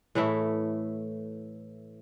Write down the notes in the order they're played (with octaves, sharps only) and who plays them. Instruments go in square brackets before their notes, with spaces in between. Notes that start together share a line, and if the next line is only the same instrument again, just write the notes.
[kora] A2 E3 A3 E4